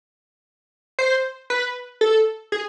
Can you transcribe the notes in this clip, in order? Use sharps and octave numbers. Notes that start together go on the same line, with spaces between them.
C5
B4
A4
G#4